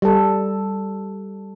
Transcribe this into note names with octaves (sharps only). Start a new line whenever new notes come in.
G3 A4